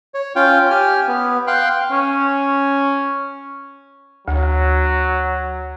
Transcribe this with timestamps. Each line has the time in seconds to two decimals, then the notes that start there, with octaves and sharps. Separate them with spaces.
0.14 C#5
0.36 C#4 F4 F5 G5
0.70 G4 G#5 F6
1.08 B3
1.47 F5 G5 C6 F#6
1.92 C#4
4.28 D2 F#3